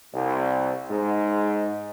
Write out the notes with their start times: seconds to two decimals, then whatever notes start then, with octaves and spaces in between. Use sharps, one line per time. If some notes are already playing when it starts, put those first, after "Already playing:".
0.13 C2
0.90 G#2